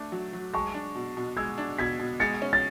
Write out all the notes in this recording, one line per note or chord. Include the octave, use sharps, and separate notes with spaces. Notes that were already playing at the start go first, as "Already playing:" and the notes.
Already playing: A3 D4
F#3
F#3
G#3 A5 C#6
D4
B2
B2
G#3 E6 G#6
D4
B2 G#6 B6
B2
G#3 A6 C#7
C#4
A6